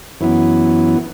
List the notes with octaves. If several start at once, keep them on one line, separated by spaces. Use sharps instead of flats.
F#2 E3 B3